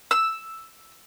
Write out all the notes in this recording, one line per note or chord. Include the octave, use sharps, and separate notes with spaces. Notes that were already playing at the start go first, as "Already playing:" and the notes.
E6